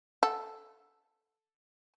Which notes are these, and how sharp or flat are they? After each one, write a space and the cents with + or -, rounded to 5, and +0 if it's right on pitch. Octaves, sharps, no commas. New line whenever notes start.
A4 +0 F#5 -20